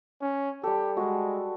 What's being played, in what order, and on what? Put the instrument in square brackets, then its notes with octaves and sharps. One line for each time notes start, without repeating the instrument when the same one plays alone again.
[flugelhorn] C#4
[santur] G3 A4 [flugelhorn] G4
[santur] G3 F#4 [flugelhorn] G#3